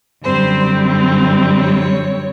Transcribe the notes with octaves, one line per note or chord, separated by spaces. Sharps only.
F#2 D3 G3 C4 C5
C#5